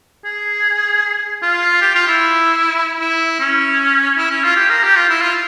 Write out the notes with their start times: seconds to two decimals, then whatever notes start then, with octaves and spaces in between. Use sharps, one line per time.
0.25 G#4
1.43 F4
1.82 G4
1.95 F4
2.08 E4
3.00 E4
3.40 C#4
4.17 E4
4.31 C#4
4.44 F4
4.56 G4
4.70 A#4
4.83 G4
4.96 F4
5.09 E4
5.22 F4